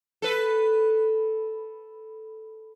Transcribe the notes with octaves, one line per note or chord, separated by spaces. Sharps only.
A4 B4